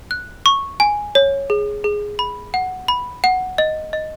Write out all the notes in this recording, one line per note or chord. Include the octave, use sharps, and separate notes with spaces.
F#6
C#6
G#5
C#5
G#4
G#4
B5
F#5
B5
F#5
D#5
D#5